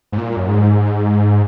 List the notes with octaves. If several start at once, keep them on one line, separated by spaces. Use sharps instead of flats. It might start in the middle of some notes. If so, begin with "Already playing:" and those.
G#2
A#2
F#2
G#2